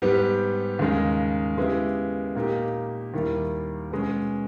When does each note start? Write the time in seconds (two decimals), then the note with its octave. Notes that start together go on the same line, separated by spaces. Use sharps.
0.02 G#2 G3 B3 G4
0.79 D#2 C#3 G#3 D#4
1.58 C#3 G#3 B3 E4 G4
2.36 A#2 A#3 D#4 G4
3.14 D#2 D#3 G3 A#3 E4
3.91 B2 G#3 C#4